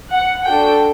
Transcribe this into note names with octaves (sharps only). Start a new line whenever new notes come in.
F#5
D4 F#4 A4 G5